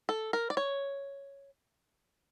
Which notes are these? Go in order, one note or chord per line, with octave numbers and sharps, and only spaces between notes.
A4
A#4
D5
C#5